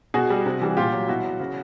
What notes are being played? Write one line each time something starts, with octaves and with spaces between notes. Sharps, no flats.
B2 F#4 G#4
G3
C3
E3 G3
A#2 F4 G4
F#3
B2 E4 F#4
F#3
C#3